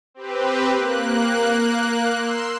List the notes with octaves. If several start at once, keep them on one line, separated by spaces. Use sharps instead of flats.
C4 G4 B4
A#3 F#6
C6 E6